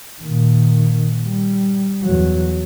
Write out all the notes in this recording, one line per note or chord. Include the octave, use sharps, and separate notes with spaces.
A#2 D#3
G3
E2 F#3